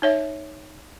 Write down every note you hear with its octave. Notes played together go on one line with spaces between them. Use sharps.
D#4 C#5 E5